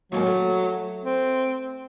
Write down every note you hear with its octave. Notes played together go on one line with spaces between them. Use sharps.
D#2 G#2 D#3 F#3
A3
C4